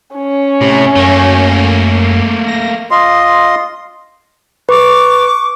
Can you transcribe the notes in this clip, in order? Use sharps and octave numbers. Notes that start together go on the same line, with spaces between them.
C#4
A2 C3
F#2 A3 A#3
A#6
F4 D#5 C6
B4 C#6 D6